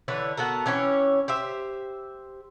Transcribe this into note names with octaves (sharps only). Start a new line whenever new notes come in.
D3 E3 B4 C#5
B3 F#4 A4 A#4
E3 C#4 G4 C#5
G4 C5 E5